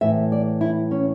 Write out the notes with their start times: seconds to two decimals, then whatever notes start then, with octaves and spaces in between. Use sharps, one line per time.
0.01 A2 E3 E5
0.32 D5
0.61 E4
0.91 C#4